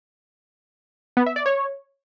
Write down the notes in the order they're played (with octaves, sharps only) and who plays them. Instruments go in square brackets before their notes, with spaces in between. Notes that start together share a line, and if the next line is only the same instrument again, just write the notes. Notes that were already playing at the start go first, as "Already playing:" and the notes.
[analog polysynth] B3
E5
D5
C#5